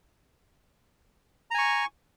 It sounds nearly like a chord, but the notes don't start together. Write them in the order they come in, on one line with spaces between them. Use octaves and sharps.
A#5 G#5 C#6